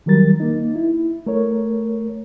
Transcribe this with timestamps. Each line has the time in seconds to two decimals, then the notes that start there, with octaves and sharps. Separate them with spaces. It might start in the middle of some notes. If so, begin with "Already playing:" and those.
0.06 D#3 F#3 G3 A#4 A6
0.40 A#3 D#4
0.76 E4
1.26 A3 A#4 C#5